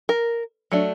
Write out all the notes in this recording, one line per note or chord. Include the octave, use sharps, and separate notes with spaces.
A#4
F#3 A3 D4